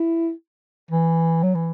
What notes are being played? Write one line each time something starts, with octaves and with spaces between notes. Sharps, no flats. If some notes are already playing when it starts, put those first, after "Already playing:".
Already playing: E4
E3
F#3
E3